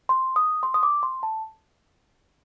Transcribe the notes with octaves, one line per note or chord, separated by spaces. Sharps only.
C6
D#6
C6
D#6
D6
C6
A5